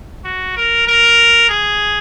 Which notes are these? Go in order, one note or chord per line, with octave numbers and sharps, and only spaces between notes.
F#4
A#4
A#4
G#4